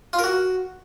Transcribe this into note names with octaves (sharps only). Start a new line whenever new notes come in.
F4
A#4
F#4